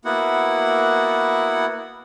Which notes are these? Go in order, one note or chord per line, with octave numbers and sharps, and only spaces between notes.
A#3 B3 E4 F#4 F#5